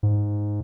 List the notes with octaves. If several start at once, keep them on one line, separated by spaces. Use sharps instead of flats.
G#2